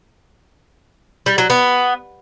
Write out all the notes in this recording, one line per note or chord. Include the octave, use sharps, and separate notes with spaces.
G3
F#3
B3